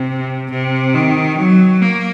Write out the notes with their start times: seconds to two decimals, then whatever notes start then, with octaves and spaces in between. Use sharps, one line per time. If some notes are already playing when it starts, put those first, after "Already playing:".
Already playing: C3
0.51 C3
0.94 D#3
1.38 F#3
1.82 A#3